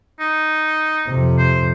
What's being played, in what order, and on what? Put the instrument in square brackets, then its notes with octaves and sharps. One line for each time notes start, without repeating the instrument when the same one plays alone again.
[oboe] D#4
[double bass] F2 C3
[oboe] C5